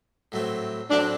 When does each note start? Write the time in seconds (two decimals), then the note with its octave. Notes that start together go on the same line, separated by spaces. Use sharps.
0.32 A2 F#3 A3 C4
0.91 A2 F#3 A3 C4 D4